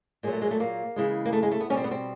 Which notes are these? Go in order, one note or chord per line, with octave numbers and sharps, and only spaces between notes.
A#2 F#3 G#3
A3
G#3
A3
A#3
C#3 E3 G#3
A#3
A3
G#3
A3
B3
B2 G3 C#4
C4
B3
C4